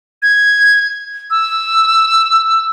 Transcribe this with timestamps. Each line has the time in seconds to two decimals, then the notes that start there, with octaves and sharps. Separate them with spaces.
0.22 G#6
1.31 E6